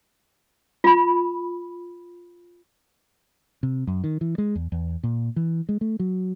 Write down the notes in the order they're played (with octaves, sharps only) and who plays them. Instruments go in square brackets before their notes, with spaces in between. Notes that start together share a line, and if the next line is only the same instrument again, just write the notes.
[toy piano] F4 B5
[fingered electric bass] C3
F#2
D#3
E3
G#3
E2
E2
A#2
E3
G#3
A3
F#3